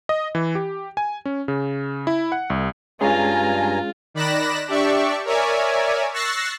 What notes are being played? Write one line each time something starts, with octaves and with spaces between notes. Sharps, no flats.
D#5
E3
G4
G#5
C#4
C#3
E4
F#5
C2
G2 G#3 C#4 F4 G#4 G#5 A#5
D#3 D5 B5 F#6 A#6 E7
D4 G4 D5 E5 C#6
A#4 C#5 D5 E5 G#5
C#6 E6 F#6 A6 A#6 C7